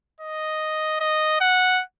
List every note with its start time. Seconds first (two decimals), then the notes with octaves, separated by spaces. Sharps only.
0.21 D#5
1.00 D#5
1.40 F#5